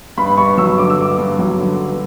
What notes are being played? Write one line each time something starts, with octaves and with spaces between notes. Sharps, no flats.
G2 B5
G2 C#6
F#3 E6
D3 D6
E6
G2 D6
G2
F#3
D3
G2